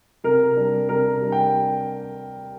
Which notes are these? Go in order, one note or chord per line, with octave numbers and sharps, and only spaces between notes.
C3 A#4
G3 D4
C3 A#4
G3 D4
G5